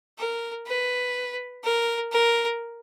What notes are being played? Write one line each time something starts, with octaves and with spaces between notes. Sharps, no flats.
A#4
B4
A#4
A#4